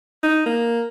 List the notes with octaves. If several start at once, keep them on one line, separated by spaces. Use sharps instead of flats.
D#4
A#3